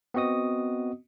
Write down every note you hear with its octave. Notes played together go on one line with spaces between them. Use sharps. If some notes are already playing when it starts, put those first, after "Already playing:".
B3 C4 F#4 D#5 D#6